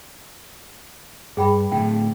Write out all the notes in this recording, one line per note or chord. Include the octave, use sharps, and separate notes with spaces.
G2 G#4 G5 B5
A2 D3 G5